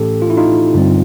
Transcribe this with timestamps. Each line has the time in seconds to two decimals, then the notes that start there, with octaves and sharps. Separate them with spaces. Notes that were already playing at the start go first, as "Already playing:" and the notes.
Already playing: A2 E3 A3 C#4 G4 A4
0.22 F4
0.30 E4
0.37 D#4 F4
0.74 G2 D3 G3 C4